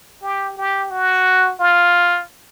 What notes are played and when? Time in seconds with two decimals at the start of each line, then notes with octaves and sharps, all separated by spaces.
0.22 G4
0.57 G4
0.91 F#4
1.60 F4